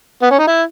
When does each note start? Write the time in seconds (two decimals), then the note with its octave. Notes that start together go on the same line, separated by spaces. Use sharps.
0.22 B3
0.31 C#4
0.39 D#4
0.47 E4